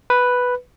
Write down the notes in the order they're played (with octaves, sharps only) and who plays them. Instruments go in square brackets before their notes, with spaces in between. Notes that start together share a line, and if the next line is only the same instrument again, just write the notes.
[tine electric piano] B4